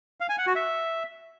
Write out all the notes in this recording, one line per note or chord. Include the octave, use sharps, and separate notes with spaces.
F5
G#5
F#5
F#4
E5